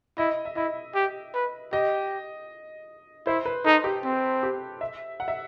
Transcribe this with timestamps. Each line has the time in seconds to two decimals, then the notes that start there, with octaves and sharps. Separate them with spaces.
0.18 E4 D#5
0.45 E5
0.56 E4 D#5
0.95 G4
1.34 B4
1.72 G4 D#5
3.27 E4 C5
3.45 B4
3.65 D#4 A4
3.84 G4
4.04 C4
4.43 G4
4.81 E5
5.20 F#5
5.28 E5